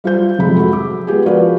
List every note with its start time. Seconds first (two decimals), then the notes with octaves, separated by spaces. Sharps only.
0.04 G3 F4 C5 G6
0.39 G#1 F2 C3 G#3 B5
0.56 F#4 G#4 A4
0.73 D6
1.07 G#3 B3 F4 G4 G#4
1.26 F3 F#4 A#4 B4 D5 F5